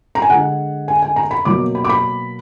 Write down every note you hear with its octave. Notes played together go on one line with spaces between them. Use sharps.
A#5
G#5
D3 G#3 F#5
G#5
G#5
A#5
B5
B2 F#3 A#3 D6
B5
D6
B5